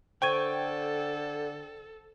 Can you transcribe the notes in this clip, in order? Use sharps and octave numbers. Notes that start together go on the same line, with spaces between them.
D3 A4 C5 G5 C#6 G#6 D#7